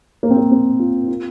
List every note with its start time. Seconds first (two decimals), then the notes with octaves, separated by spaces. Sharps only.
0.23 A#3
0.31 C4
0.37 A#3
0.52 C4
0.79 F4
1.08 F4